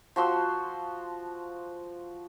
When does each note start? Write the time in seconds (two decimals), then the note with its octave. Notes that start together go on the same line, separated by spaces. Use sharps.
0.16 F3 F#4 C6 E6